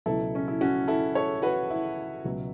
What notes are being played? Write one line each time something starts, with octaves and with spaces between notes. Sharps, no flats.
C#2 B2 F#3 E4 A4
C#4
E4
C#4 F#4
E4 A4
A4 C#5
F#4 B4
E4
C#2 B2 F#3